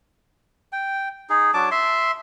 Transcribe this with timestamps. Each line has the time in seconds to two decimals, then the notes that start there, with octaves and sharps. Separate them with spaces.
0.72 G5
1.30 D#4 G#4
1.54 F#3 D4 A5 D6
1.71 E5 C6